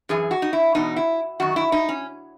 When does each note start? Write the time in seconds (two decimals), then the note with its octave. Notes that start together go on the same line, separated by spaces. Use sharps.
0.09 F#2 E3 G#4
0.31 F#4
0.42 D#4
0.53 E4
0.75 E2 B2 D#4
0.96 E4
1.40 F#2 D#3 F#4
1.56 E4
1.72 D#4
1.89 C#4